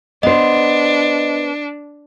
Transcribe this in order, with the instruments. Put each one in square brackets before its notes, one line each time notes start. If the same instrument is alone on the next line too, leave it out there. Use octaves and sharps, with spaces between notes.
[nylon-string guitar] B3 C5 [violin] D4 [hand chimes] D#5